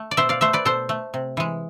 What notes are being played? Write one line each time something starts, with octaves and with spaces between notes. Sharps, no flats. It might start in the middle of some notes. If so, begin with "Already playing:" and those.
Already playing: A3
D5
B2 C5 E5
D5 F5
A3 C5 E5
B4 D5
B2 A4 C5
A3
C3
E3 G#3